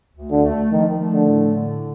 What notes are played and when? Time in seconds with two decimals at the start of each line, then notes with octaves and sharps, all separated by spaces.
0.16 D2
0.30 D3
0.44 A3
0.72 D#3 F3
1.00 A3
1.13 D3
1.27 A2
1.55 D3